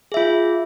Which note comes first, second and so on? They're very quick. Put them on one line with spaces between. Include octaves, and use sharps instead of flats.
G#4 E5 F4